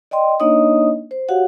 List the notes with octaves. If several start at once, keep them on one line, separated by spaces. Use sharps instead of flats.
D5 D#5 G5 C6
A#3 D4 D#4 C#5 D#5 D#6
C5
F#4 G4 C#5 F5 F#5